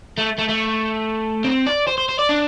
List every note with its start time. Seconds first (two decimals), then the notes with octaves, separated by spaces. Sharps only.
0.18 A3
0.39 A3
0.49 A3
1.44 C4
1.67 D5
1.87 C5
1.98 C5
2.09 C5
2.19 D5
2.29 D4